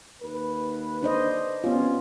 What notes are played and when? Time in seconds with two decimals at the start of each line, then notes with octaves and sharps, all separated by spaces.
0.22 D#2 B4
1.03 D4 C5 D#5
1.64 C3 B3 C#4 F4